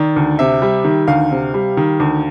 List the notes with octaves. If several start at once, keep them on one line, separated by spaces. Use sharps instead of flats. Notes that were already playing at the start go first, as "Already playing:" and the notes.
Already playing: D#3 D5
D2
C3 E5
G3
D#3
D2 F5
C3
G3
D#3
D2